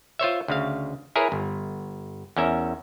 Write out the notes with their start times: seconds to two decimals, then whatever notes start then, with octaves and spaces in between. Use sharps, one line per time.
0.19 F4 C5 C#5 E5
0.48 D2 C#3 F5
1.16 E4 G#4 A#4 B4 C#5
1.32 G1
2.37 E2 C#4 A#4 E5